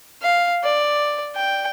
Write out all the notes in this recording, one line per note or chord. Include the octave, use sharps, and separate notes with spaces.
F5
D5
G5